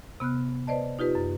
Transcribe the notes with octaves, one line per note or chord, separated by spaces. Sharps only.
C3 B3 F6 F#6
B4 C5 D5 D#5 A5
D#4 F4 G4 B4
F#2